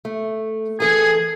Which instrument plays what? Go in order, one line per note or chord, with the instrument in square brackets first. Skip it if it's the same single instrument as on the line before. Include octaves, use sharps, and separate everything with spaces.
[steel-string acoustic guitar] A3
[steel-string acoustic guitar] E3 A4 G#5 [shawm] G#4